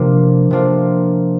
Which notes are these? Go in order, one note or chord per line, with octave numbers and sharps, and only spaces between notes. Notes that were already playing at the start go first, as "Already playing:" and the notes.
Already playing: C3 F3 A#3 D4 F4
C3 F3 A#3 D4 F4